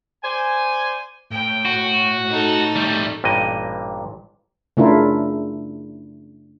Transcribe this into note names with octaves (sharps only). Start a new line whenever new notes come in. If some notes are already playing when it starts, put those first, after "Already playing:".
C5 D5 G#5
A2 G5
F#4
D#4 A4
G3 A3
A1 G2 A#2 D#5
C#3 A3 D4 E4 F4 A#4